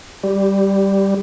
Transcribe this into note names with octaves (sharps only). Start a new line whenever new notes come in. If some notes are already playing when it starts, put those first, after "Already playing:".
G3